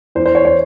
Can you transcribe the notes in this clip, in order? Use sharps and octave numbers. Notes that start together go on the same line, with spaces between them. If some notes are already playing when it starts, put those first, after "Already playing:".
E2 E3 C5
C5
C#5
C#5